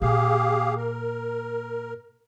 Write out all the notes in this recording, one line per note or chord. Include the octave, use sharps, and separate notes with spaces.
A#2 G4 G#4 F5
A#4